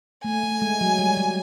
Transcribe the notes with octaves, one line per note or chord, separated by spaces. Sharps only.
A3 G#5
A3
G#3
F#3
G3
F#3